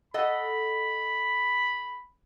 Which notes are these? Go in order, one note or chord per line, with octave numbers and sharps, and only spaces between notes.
A4 D#5 F#5 B5